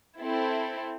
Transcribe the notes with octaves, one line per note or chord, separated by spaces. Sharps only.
C4 E4 A4